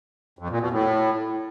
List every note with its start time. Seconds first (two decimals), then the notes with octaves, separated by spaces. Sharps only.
0.39 F2
0.50 A#2
0.60 B2
0.71 A2